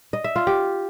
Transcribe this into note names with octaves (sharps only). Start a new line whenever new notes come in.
D#5
E5
F4
G4